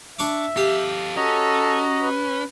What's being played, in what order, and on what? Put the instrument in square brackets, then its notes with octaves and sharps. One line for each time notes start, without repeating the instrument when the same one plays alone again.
[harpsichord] D4 C#6 D6 [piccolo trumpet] E5
[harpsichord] G4 [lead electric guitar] A4 F5
[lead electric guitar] C#4 [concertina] F#4 D#5 A#5 [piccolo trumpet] A4
[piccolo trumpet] B4